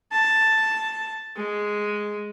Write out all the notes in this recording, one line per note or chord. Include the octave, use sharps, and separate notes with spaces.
A5
G#3